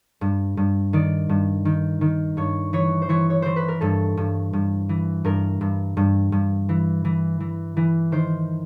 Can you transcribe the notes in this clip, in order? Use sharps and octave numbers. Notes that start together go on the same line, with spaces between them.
G2
G2
D#3 D5
G2
D#3
D#3
G2 C#5
E3 C#5
C5
E3 C#5
C#5
E3 C5
B4
A#4
G2 A4
G2
G2
E3
G2 A#4
G2
G2
G2
E3
E3
E3
E3
D#3 C5